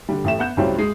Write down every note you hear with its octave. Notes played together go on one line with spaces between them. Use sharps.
D3 G3
A1 A3 G4 E7
B3 F#5 G6 E7
C#2 A2 F#3 G3 C4 C#4
G#3